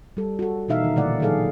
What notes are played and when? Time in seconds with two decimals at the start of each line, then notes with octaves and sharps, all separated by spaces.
0.17 G3 A4
0.39 F#4 A4
0.68 B2 E3 D#4 E5 F5
0.84 D#3
0.96 A#2 D3 E3 A3 D5 F#5
1.20 D#3 F#3 E4 G#4 A4 F5